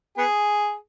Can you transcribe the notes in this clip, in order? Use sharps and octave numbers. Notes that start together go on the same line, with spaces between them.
B3 G#4